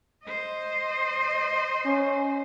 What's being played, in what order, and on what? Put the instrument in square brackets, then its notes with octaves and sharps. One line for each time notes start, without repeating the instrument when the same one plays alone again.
[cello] C5 D#5
[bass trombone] C#4